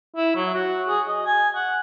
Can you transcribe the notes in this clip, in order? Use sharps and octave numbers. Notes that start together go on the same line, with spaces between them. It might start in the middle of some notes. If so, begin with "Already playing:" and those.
E4
F#3
F#4
G#4
D#5
G#5
F#5